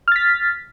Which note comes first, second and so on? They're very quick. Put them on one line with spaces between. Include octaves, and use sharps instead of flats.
F6 A6 B6